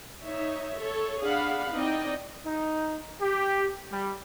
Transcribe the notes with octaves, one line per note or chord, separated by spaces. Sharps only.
D#4 C#5 E5
A4 C#5
D4 G#4 F5 F#5 B5
C4 D#4 E4 D5 D#5 G5
D#4
G4
G3